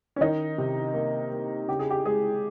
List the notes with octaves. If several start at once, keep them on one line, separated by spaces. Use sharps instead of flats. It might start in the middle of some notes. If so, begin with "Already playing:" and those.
C#4
D#3 D#4
C3
A#3
A#3
C#3 G4
G#4
G4
G#3 G#4